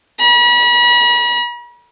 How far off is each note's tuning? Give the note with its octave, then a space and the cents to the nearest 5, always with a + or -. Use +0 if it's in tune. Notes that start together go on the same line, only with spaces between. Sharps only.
B5 -40